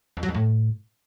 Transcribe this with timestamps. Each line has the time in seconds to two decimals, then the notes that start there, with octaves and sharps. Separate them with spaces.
0.17 F2
0.23 F#3
0.29 F2
0.34 A2